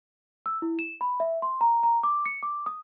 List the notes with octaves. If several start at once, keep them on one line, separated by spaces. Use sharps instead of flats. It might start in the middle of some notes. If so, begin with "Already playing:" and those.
E6
E4
E7
B5
E5
C6
A#5
A#5
D6
C#7
D6
D#6